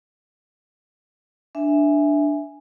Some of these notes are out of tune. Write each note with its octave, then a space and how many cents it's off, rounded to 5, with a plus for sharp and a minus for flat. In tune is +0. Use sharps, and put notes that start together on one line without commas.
D4 +0 E5 +0 G#5 +0